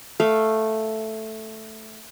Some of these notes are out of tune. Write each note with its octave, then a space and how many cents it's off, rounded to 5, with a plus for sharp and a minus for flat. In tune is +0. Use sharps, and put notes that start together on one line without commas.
A3 +0 F5 +0